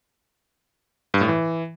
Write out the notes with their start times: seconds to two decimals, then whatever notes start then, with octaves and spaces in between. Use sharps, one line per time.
1.14 G2
1.21 A2
1.28 E3